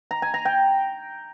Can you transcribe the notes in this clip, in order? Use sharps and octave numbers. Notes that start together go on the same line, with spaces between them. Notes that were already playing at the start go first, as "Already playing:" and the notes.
A#5
G#5
A#5
G5